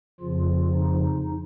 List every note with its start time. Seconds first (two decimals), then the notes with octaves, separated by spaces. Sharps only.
0.20 F2 C#3 F3 F4
0.74 D#4